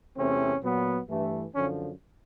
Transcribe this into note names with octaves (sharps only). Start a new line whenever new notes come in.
E2 C3 E3 A3 C4 C#4
A#2 F#3 B3
G2 E3 A3
F#2 D3 F3 C#4